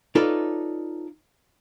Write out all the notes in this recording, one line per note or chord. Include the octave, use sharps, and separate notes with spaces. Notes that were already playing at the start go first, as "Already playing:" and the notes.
D#4 F4 A4 B4 C#5 D5